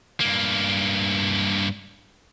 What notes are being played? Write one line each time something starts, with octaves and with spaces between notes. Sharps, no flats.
G2 A#3